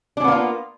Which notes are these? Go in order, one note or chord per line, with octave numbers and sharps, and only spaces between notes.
A#3 B3 C#4 D4 F4